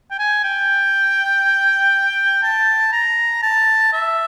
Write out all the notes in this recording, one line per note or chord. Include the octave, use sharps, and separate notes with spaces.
G5
G#5
G5
A5
A#5
A5
E5